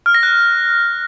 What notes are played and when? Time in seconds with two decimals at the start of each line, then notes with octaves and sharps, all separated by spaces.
0.06 F6
0.15 A#6
0.23 F#6